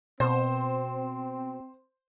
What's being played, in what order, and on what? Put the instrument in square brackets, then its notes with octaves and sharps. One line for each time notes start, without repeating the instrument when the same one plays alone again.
[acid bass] B2 [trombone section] C4 [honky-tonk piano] C5